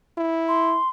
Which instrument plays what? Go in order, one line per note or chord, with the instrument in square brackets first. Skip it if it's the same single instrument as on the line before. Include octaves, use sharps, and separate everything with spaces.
[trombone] E4
[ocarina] C6